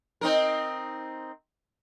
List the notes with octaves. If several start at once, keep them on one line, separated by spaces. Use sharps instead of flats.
C4 D#4 A#4